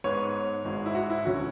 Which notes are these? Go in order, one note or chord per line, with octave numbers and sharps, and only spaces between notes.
G#2 G#3 B3 C#5
G#1 G#2 G#3
E4
F#4
E4
E1 D2 D3 F#3 C#4 F#4